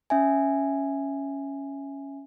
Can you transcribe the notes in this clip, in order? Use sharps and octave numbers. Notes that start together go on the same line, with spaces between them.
C#4 E5 G#5